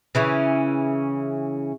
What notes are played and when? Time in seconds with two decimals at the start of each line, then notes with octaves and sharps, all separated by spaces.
0.15 C#3 E3 C#4